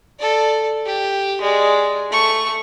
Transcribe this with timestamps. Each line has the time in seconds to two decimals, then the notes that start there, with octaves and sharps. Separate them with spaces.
0.19 A4 D5
0.86 G4
1.42 G#3 D5
2.11 A3 C#6